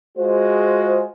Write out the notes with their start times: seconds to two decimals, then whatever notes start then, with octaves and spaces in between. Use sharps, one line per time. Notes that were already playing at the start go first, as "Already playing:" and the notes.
0.18 G#3 F4 F#4 G#4 C5